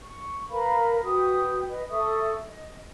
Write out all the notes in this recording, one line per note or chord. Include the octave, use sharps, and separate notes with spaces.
C#6
A#4 B4 F5 B5
F#4 B4 G5 D#6
B4 D#5
A4 E5 C#6 D#6
D#5